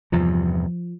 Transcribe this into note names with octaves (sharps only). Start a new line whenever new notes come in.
E2 G2 C3 F3